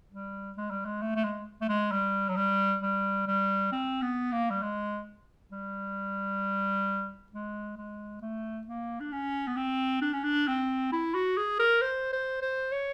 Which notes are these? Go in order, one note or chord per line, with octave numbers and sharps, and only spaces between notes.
G3
G#3
G3
G#3
A3
A3
G#3
A3
G#3
G3
F#3
G3
G3
G3
C4
B3
A#3
G3
G#3
G3
G#3
G#3
A3
A#3
D4
C#4
B3
C4
D4
C#4
D4
C4
E4
F#4
G#4
A#4
C5
C5
C5
C#5